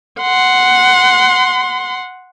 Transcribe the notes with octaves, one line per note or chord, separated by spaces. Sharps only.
F#5 C6